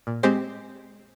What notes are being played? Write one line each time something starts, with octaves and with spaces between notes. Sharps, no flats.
A#2
G#3 C4 G4 C5